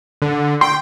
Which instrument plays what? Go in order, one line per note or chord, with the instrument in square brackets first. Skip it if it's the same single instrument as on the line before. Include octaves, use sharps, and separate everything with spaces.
[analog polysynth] D3
[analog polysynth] G5 [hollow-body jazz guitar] C6